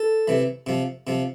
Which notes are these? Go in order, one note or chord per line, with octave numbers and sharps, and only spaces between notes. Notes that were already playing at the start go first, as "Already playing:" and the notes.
Already playing: A4
C3 E3
C3 F3
C3 F3